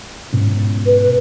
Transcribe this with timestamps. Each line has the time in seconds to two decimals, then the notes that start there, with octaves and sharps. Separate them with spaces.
0.33 G#2 B2 C#4
0.86 B4